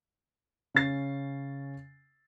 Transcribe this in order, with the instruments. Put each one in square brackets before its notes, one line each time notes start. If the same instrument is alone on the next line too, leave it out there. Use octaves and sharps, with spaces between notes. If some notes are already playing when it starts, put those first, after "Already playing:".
[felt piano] C#3 C#4 A6 C7